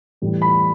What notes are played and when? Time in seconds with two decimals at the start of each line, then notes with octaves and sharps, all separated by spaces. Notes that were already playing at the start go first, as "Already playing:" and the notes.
0.22 A2 E3 G3
0.42 B5